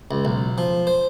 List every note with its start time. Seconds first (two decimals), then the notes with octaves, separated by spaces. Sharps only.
0.11 C#2
0.25 B1
0.58 F3
0.87 C5